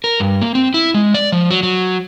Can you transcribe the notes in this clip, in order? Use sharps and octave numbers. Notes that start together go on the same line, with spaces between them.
A#4
G2
A#3
C4
E4
G#3
D5
F3
F#3
F#3